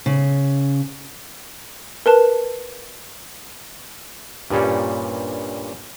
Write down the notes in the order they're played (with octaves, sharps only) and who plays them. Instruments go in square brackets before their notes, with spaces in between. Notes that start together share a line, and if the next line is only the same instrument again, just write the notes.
[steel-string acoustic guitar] C#3
[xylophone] A#4 B4 A5
[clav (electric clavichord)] G2 A#2 G3 C#4